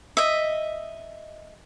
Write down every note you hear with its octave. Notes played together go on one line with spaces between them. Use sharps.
D#5 E5